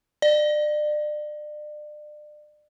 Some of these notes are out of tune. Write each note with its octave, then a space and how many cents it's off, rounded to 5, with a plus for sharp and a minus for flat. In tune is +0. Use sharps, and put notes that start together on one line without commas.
D5 +35